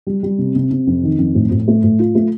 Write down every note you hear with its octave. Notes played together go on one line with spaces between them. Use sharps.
G3
G3
C3
C3
C3
F2
D#3
F2
A2
A2
A3
A2
F4
A3